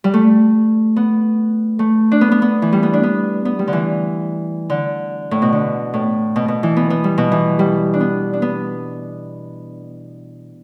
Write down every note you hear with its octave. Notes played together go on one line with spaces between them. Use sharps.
G3
A3
B3
A3
D4
B3
B3
B3
E3
G3
B3
D4
B3
B3
G3
D3
E3
D3
A2
B2
D3
A2
B2
B2
E3
B3
B3
G3
B2
E3
G3
D4
B3
D4
B3